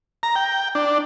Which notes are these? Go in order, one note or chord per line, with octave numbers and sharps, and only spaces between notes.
A#5
G5
D4